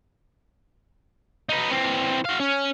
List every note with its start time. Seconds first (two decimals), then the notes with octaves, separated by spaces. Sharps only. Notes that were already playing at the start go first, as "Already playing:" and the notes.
1.49 B3 D#4
1.72 E3 C4
2.25 F#4 F5
2.40 C#4